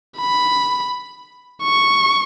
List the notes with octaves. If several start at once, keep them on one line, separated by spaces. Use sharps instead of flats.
B5
C#6